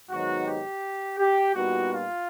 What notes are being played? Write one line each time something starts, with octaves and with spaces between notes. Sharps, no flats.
G#2 D#3 F#3 B3 D#4 F#4
G4
G4
A#2 G3 B3 D#4 F#4
F4